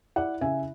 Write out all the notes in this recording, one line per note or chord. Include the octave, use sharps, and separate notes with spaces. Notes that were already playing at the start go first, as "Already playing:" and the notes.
E4 D5 F#5
C#3 E5 G#5